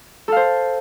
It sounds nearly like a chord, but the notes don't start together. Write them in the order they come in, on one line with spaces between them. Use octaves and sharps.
A4 F5 C5